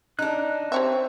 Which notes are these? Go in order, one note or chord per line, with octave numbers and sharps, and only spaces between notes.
D4 D#4 F#6
C4 G4 C#5 E5